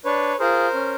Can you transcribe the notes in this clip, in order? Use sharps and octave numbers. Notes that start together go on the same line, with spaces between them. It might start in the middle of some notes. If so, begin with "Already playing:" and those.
D4 B4 C#5
F4 G#4 A#4 C5
C#4